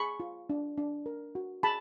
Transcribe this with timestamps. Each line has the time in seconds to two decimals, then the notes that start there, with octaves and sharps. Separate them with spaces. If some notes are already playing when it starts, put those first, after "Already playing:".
Already playing: G#4 B5 C#6
0.20 F4
0.50 D4
0.77 D4
1.06 A#4
1.35 F#4
1.63 G#4 A5 B5